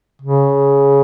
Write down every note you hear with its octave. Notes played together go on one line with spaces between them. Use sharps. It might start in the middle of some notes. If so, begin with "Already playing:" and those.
C#3